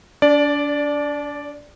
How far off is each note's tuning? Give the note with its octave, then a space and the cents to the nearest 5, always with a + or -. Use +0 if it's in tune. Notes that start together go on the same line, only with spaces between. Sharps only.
D4 -35 D5 +0